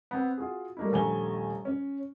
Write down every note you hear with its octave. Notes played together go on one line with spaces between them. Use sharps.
B3 C4
F4 F#4 G#4
G3 A3 A#3 D#4 E4
D#1 A#1 A3 G#5 A#5 G7
C#4